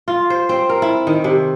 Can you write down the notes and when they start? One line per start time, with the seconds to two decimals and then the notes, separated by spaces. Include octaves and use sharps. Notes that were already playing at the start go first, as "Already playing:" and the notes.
0.08 F4
0.30 C5
0.49 C4
0.69 A#4
0.82 E4
1.07 D#3
1.24 C3